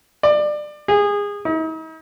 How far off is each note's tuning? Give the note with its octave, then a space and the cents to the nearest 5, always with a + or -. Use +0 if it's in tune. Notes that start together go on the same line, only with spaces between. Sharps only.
D5 +25
G#4 -25
D#4 +45